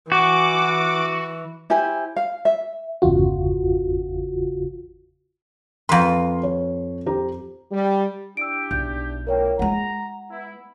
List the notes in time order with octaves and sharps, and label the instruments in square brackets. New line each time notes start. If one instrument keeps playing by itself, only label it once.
[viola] E3 [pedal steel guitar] F#4 [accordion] D6
[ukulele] E4 G4 C5 G#5
F5
E5
[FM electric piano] G1 E2 C#3 F4 F#4
[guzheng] F2 B4 [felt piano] F5 A#5 C6
[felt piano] C#5
G4 C5 A#5
[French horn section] G3
[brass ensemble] D4 E4 G4 [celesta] E6 D7
[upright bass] B1 [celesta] G6
[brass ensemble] F#2 A2 A#3 [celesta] A#4 C#5 G5
[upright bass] G#3 F4 [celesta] F#5 [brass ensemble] A#5
[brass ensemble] B3 E4